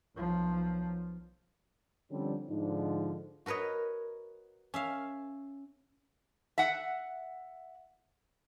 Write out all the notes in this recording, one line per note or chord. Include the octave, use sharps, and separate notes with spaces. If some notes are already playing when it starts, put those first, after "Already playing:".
B1 F3
D3 F3 G3 C4 C#4
G#2 D3 F3 D4 D#4
F#4 A#4 B4 C#5 D#5
C#4 E5 F5
E5 F#5